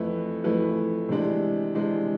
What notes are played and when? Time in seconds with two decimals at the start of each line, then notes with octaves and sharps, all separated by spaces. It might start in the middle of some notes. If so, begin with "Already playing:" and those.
Already playing: F2 E3 A3 E4 B4
0.44 F2 E3 A3 E4 B4
1.09 C3 E3 G#3 D4
1.75 C3 E3 G#3 D4